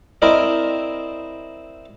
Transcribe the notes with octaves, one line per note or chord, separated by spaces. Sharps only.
C4 E4 A#4 D5 D#5